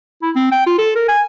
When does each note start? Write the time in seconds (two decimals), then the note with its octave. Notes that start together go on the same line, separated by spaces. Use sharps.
0.22 E4
0.36 C4
0.52 G5
0.66 F4
0.78 A4
0.95 A#4
1.08 G#5